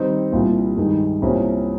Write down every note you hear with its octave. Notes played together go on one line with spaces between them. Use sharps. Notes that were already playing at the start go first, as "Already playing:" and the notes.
Already playing: D#3 G3 C4 D#4
C2 A#2 G3 A#3 F4
G2 D#3 G#3 D#4
C2 C3 F3 A#3 C#4